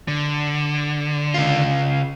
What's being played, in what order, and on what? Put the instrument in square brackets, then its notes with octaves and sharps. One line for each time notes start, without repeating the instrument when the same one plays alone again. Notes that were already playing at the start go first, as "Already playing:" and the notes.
[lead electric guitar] D3
[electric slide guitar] C#3 F4